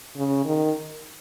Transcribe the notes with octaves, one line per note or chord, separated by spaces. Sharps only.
C#3
D#3